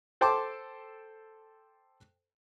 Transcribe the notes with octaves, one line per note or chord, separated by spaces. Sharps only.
A4 C5 G5 A5 C6 D6